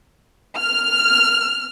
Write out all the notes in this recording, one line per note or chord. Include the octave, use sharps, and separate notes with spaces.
F6